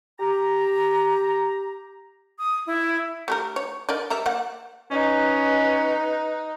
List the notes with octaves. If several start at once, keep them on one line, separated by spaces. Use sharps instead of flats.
G4 A#5
D#6
E4
A3 G4 A#4
C#5
A#4 D5 D#5
G3 A#4 E5
A#3 F#5
C#4 D#4 B4